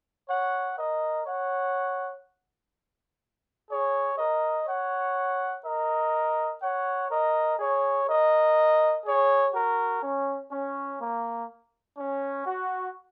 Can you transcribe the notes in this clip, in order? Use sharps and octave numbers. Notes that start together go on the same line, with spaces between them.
C#5 F#5
A#4 D#5
C#5 F#5
G#4 C#5
A#4 D#5
C#5 F#5
A#4 D#5
C#5 F#5
A#4 D#5
G#4 C#5
A#4 D#5
G#4 C#5
F#4 A#4
C#4
C#4
A#3
C#4
F#4